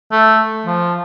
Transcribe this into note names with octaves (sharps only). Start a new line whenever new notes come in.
A3
F3